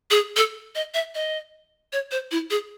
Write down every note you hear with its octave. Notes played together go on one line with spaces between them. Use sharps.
G#4
A4
D#5
E5
D#5
C#5
C5
E4
G#4